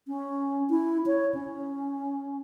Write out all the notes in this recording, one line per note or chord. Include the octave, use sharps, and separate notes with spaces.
C#4
E4
C#5
C#4